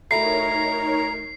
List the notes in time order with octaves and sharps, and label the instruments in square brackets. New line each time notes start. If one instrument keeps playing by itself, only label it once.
[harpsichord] D2 A2 [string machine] D#4 A#4 C#5 [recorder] A#5 [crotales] C7